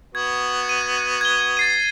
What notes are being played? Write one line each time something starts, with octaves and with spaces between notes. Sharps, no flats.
B3 F#4 G#6
D#7
G#6 G7
A6 C7 D#7